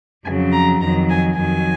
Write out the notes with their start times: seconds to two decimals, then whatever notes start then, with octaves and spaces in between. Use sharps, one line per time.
0.24 F2 C#3 F#3 G#5
0.53 A#5
0.81 F2 D#3 F#3 A#5
1.09 G#5
1.37 F2 D#3 F#3 G#5